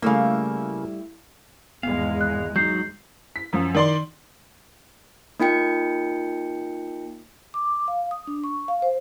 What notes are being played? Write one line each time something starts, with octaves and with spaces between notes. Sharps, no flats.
C#3 G3 A3 A#3 E4 E5 F5
G#1 E2 G#3 B3 F5
F#6
F#3 D#4 G6 C7
B6
F#2 F3
D#3 D5 C6
A#3 D#4 F4 G5 C#7
D6
F5
D#6
D4
C#6
F5
C5